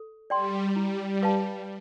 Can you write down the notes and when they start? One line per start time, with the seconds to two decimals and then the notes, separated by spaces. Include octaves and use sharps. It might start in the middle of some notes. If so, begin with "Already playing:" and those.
Already playing: A4
0.30 G3 D5 G5 C6
0.76 G3 E4
1.07 G3
1.23 B4 F5 A5